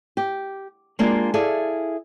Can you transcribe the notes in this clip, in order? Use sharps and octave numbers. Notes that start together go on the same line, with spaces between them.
G4
G#3 A#3 D4 F4 G4
E4 G#4 A4 D5 E5 F5